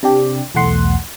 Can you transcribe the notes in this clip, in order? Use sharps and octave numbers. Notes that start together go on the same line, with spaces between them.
C3 D4 G4
B1 E2 A3 F#5 C6